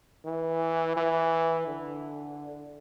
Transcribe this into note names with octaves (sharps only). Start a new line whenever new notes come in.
E3
E3
D3